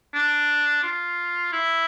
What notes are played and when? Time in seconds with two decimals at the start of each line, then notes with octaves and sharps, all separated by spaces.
0.14 D4
0.83 F4
1.52 E4